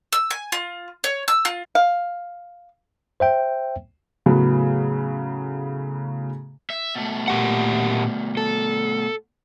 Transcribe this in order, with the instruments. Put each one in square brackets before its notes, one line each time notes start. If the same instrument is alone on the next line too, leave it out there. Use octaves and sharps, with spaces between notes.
[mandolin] E6
G#5
F4
C#5
E6
F4
[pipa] F5
[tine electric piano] C5 E5 G5
[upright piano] A2 C#3 F#3 B3
[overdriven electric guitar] E5
B2 A3
[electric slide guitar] A#2 G4 F#5
A4